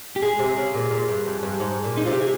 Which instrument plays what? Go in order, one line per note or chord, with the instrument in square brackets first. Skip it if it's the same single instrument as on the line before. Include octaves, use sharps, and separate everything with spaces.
[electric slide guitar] G4
[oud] G#3 [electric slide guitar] G#4
[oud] C3
C#3
A#2
A#2
G2
F2
G2
G#2
A#2
[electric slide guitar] D#4
[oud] C3 [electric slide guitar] F4
[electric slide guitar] G4
G#4